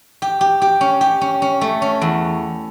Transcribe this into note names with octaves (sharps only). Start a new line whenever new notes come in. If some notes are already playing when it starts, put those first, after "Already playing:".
G4
G4
G4
C#4
G4
C#4
C#4
A3
C#4
E2